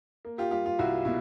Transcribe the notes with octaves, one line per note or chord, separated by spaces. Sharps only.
A#3
F4 G4
G3 F4 G4
F4
C2 E4 F#4
B2 E4